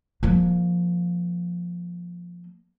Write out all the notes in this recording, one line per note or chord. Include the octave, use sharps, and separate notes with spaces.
F3 A#3